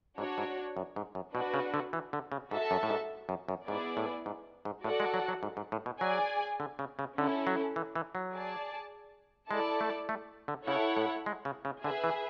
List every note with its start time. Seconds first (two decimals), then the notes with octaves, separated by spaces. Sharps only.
0.18 G#2 D4 F#4 C#5
0.38 G#2
0.77 F#2
0.96 G#2
1.15 F#2
1.35 B2 D4 F#4 B4
1.54 C#3
1.74 D3
1.93 E3
2.13 D3
2.32 C#3
2.51 G#2 F#4 A4 E5 A5
2.71 F#2
2.83 A2
2.90 G#2
3.29 F#2
3.48 F#2
3.68 G#2 B3 E4 G#4 D5
3.97 A2
4.26 G#2
4.65 G#2
4.84 A2 F#4 A4 D5 F#5
5.00 G#3
5.14 F#3
5.28 F#3
5.43 G#2
5.57 G#2
5.72 A2
5.86 B2
6.01 F#3 G#4 D5 G#5
6.60 D3
6.79 C#3
6.99 C#3
7.18 D3 C#4 E4 A4
7.47 F#3
7.76 E3
7.95 E3
8.15 F#3
8.34 G#4 D5 A5
9.51 G#3 E4 A4 D5 A5
9.81 A3
10.09 A3
10.48 D3
10.67 C#3 E4 A4 C#5 F#5
10.97 A2
11.26 G#3
11.45 C#3
11.65 C#3
11.83 D3 G#4 B4 E5
12.04 E3